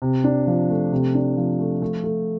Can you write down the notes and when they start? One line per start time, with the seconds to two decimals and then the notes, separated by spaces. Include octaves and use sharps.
0.02 C3
0.24 D4
0.47 F3
0.69 A3
0.92 C3
1.14 D4
1.37 F3
1.59 A3
1.82 A3
2.04 A3